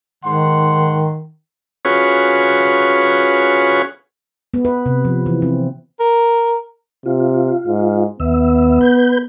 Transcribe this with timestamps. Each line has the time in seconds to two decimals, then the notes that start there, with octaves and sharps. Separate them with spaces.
0.24 G#2 D#3 F#5 C6
1.85 C#4 F4 F#4 G#4 B4 C#5
4.54 B3
4.65 B4
4.86 C3
5.05 F3
5.26 E3
5.42 C4
6.00 A#4
7.06 C3 F4
7.68 G#2
8.20 D#2 B3 E5
8.81 B4 G6